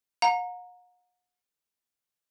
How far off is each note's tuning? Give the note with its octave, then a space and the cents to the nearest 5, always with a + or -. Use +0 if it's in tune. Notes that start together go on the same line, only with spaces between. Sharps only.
F#5 -45 A#5 +0